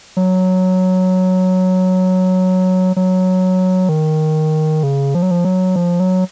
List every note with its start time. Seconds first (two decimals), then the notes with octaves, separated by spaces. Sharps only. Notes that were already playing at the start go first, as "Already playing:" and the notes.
0.17 F#3
2.96 F#3
3.89 D#3
4.83 C#3
5.14 F3
5.22 F#3
5.31 F3
5.44 F#3
5.76 F3
6.00 F#3